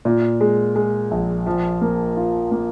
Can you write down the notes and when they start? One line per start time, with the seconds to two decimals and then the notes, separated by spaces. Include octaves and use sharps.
0.05 A#2
0.41 G#3
0.76 G#3
1.11 A#1
1.47 F3
1.81 A#3
2.17 F4
2.51 A#3